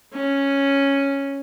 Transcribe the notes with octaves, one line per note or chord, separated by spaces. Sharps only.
C#4